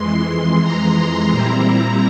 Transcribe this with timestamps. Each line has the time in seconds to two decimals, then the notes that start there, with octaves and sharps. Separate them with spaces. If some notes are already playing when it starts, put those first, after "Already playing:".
Already playing: F2 E3 G#3 C6
0.62 A#5
0.96 C6
1.31 A#2 G3 C4 E4 A#5